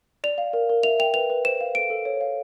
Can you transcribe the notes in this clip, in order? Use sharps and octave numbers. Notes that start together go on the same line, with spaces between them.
D5 F7
F5
A#4
A#4
E5 F7
G5 F7
B4 F7
B4
C5 E7
F5
A4 D7
A4
C#5
F5